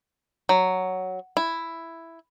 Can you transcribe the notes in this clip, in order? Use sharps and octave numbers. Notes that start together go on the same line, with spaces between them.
F#3
E4